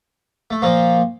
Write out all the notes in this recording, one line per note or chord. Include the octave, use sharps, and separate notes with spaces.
A3
A#2 F3 A#3